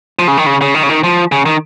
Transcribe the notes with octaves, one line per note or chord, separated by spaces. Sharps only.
F3
C#3
D#3
C#3
C#3
D#3
C#3
D#3
F3
C#3
D#3